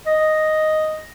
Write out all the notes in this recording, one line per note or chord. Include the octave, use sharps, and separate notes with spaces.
D#5